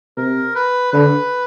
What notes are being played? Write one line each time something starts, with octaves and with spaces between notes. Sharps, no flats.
C3 A#4
B4
D3 B4